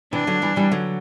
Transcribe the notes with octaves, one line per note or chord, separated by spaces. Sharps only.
C3 E3 D4
D3 F#3
E3 G3
E3 G3
D3 F#3